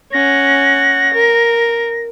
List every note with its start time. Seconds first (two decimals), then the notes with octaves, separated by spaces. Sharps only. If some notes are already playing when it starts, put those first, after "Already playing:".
0.12 C#4 F#5 A#6
1.13 A#4